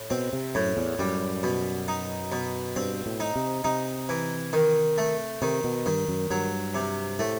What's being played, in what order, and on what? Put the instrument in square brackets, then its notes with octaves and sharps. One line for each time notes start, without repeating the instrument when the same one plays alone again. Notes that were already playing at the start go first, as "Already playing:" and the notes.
Already playing: [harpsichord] A2
[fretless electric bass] B2 [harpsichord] C4
[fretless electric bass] C3
[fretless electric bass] F#2 [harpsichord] A2
[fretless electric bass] E2
[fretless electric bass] F#2 [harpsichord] G3
[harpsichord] B2
D#4
B2
[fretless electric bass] G2 [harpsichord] C4
[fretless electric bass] A2
[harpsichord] D#4
[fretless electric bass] C3
[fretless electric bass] C3 [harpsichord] D#4
[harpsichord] E3
D#3
A3
[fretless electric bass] C3 [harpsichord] D#3
[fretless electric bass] B2
[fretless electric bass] G2 [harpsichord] D#3
[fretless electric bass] F#2
[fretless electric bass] G2 [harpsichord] F#3
[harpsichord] C3
[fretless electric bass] A2 [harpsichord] A3